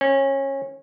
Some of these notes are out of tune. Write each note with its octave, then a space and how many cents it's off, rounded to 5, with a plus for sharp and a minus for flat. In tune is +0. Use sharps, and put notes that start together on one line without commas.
C#4 -25